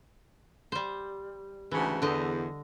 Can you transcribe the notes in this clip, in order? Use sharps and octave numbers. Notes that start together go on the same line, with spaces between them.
G3 C5
D2 G#2 C#3 E3
E2 D3 D#5